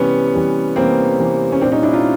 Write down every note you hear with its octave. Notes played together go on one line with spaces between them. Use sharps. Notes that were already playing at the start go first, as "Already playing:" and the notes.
Already playing: C3 E3 G3 B3 C#4
C3 E3 G3
C3 E3 G3 A#3 C4
C3 E3 G3
C#4
A#2 G3 C4 D4
C#4 D#4
D4 E4
D#4 F4